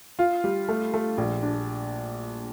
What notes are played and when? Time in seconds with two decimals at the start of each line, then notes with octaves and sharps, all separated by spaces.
0.19 F4
0.44 G3
0.69 A3
0.94 A3
1.18 A#1
1.43 D4